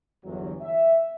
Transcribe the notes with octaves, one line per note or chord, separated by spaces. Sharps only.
G1 E2 F#3
E5